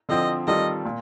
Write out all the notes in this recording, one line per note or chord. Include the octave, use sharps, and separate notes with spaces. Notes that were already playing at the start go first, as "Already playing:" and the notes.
D3 F3 C4 D#5
D#3 G3 C4 F4 A4 D#5
A#2